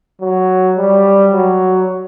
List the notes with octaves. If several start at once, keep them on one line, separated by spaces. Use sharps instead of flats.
F#3
G3
F#3